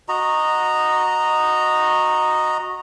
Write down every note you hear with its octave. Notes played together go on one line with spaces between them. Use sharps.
F#4 D#5 A#5